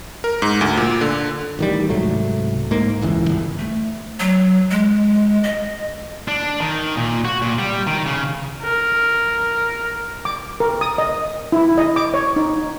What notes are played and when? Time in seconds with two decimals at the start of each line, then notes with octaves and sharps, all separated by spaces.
0.24 A#4
0.42 G#2
0.61 D2
0.77 A#2
1.01 D3
1.59 A1 D#3 G3
1.89 C2 G#2 F#3 A3
2.71 G#2 A#3
3.01 D1 G1 C#2 E3
3.29 G1
3.59 A3
4.20 F#3
4.71 G#3
5.44 D#5
6.28 D4
6.60 D#3
6.97 A#2
7.25 F#4
7.42 A#2
7.59 G3
7.87 D#3
8.06 C#3
8.62 A#4
10.25 D6
10.60 A#4
10.81 D#6
10.98 D#5
11.52 E4
11.78 D#5
11.96 D6
12.14 C#5
12.36 D#4